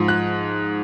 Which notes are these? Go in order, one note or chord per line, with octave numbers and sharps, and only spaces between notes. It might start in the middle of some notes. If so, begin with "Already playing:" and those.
Already playing: G#2 F3
F#6